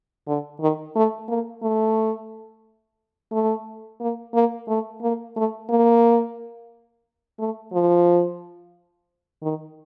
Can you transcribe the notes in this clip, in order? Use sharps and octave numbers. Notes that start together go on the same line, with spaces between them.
D3
D#3
A3
A#3
A3
A3
A#3
A#3
A3
A#3
A3
A#3
A3
F3
D#3